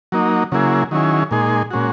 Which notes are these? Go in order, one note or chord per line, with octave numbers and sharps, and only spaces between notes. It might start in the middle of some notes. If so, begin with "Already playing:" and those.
F#3 A#3 D#4
C#3 F#3 A#3 E4 G#4
D#3 F#3 C#4 E4 G#4
A#2 G#3 D#4 G#4
A#2 G#3 C#4 F#4